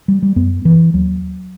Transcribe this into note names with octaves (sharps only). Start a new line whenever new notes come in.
G3
G3
F#2 B3
E3
D#2 F#3